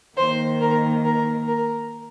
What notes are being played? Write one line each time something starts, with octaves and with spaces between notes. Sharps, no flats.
D#3 A#3 C5
A#4
A#4
A#4